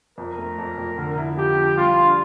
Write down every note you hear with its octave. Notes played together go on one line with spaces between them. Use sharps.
F2 A#4
A3
F2
F2
D3
E4
F3 G4
F3
G3 F4
D4